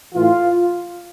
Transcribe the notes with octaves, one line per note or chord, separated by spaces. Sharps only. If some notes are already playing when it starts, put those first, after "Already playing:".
A2 E3 F4